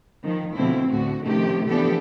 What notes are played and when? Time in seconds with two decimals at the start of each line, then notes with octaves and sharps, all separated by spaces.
0.22 D#3 F3
0.56 B2 D3 F3 A3 C4 E4
0.90 D2 A2 D3 F#4
1.24 C3 D#3 F3 A3 C#4 G4
1.69 E3 F3 B3 D4 G4 A4